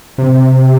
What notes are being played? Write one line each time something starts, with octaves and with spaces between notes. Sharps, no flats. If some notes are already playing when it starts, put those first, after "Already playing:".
C3